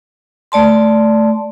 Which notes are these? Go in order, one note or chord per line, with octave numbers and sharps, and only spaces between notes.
A3 D5 A5 C6